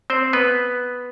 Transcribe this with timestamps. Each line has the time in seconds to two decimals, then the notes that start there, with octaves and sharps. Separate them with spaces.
0.10 C4 C5
0.33 B3 B4